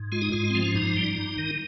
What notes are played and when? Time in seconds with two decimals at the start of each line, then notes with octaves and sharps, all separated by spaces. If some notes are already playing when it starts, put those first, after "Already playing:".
Already playing: G#2
0.12 G#3 F4
0.22 D#4
0.32 G#2 F4
0.50 F3 C4
0.63 C#4
0.75 G2 D#4
0.96 G3
1.18 G2
1.38 D#3